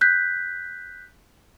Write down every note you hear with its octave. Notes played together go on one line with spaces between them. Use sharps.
F#6 G6 B6